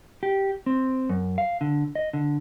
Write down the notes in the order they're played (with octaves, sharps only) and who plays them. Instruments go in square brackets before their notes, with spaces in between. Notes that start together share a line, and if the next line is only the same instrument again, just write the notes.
[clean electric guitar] G4
C4
F#2
F5
D3
D#5
D3